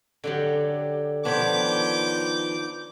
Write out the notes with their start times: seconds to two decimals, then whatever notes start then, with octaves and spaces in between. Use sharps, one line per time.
0.24 D3 F#3 G4
1.25 D#3 F3 B3 D4 C#5 D6 G6